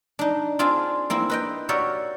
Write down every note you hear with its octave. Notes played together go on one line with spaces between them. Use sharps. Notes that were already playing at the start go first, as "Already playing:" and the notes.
D4 D#4
C4 D4 F4 G#4
A#3 C4 E4
B4 D#5 G5
F#4 G4 A#4 C#5 D5 E5